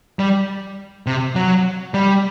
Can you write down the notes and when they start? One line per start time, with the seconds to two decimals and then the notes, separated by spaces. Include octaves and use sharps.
0.19 G3
1.07 C3
1.35 F#3
1.94 G3